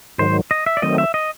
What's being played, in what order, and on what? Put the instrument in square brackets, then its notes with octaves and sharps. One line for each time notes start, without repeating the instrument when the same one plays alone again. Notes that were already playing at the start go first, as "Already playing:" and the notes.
[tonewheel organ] G#2 D#3 F#3 [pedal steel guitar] C5
[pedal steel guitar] D#5
E5
D5
[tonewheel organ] D#3 F#3 A3 C4 [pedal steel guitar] D#5
[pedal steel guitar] E5
D#5